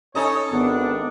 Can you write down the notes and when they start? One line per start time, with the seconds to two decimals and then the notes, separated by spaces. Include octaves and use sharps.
0.15 C#4 D#4 A4 C#5 D#5
0.51 G#1 B3 D4